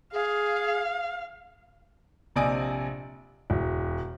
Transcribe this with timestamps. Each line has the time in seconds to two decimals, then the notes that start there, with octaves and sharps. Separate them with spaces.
0.12 G#4 F5
2.36 A#1 C3 D5 D#5 G#5 D7
3.50 E1